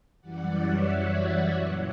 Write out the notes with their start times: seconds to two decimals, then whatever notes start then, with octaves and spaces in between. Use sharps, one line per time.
0.21 F#2 E3 G3 D5 F#5
0.55 C#5 E5
0.87 F#4
1.53 A#2 F#3